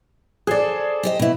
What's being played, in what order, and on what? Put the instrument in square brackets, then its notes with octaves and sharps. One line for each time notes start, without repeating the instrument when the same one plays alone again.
[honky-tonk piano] G#4 D5 [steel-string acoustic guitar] A4 C5
[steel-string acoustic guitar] G4 C5 D#5
B2 E4